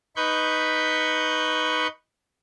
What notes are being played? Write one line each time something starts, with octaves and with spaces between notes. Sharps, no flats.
D#4 B4 B5 C#6 G6